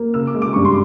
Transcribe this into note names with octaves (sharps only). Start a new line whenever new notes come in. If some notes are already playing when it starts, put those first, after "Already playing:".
Already playing: A#3
C#3 E6
D6
G#3
D6
G2 C#6
C6